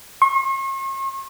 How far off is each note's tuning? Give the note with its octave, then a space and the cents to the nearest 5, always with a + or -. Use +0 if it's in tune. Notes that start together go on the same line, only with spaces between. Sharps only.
C#6 -45